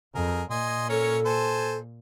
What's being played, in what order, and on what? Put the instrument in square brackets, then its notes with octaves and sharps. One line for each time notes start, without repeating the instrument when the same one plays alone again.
[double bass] F2 [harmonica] G#4 A#4
[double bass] A#2 [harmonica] D#5 G#5 C6
[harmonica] C#4 A#4 C#5 [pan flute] A4
[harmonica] C5 G#5 A5